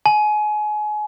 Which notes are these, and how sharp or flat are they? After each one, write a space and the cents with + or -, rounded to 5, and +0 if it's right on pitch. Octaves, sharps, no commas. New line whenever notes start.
G#5 +30